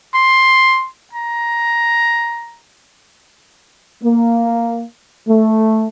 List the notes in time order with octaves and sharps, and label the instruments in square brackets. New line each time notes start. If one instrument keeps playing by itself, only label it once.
[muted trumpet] C6
A#5
[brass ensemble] A#3
A3